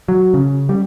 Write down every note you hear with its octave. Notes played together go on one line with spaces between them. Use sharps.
F#3
C#3
G3